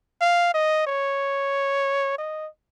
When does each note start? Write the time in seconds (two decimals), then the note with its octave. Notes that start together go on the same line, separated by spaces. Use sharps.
0.21 F5
0.54 D#5
0.87 C#5
2.18 D#5